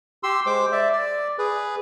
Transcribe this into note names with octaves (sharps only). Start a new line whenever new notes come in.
G4 C6 E6
G#3 C5 D6
D5 E5
D5
G#4 B4